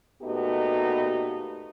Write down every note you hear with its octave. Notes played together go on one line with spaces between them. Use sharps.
A#2 A3 B3 D#4 F#4 G4